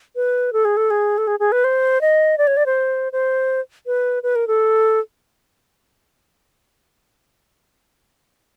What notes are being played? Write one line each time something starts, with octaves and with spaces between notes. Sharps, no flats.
B4
A4
G#4
A4
G#4
A4
G#4
G#4
B4
C5
D#5
D5
C#5
D5
C5
C5
B4
B4
A#4
A4